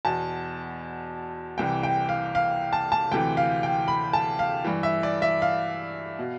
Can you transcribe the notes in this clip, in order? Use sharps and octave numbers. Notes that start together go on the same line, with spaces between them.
E2 B2 A5
C2 C3 E3 G5
G5
F5
F5
A5
A5
D2 C3 E3 G5
F5
G5
B5
A5
F5
G2 E3
E5
D5
E5
F5
B2